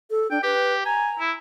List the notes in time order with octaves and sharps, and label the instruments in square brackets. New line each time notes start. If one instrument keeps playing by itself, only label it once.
[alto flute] A4
[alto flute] D4 [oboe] G5
[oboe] G4 [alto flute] B4
[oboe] G#5 [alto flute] A#5
[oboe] E4